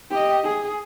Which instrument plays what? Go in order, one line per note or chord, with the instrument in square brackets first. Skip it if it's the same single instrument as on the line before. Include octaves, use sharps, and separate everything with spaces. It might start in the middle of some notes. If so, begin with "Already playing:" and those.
[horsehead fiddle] G4 D#5
G#4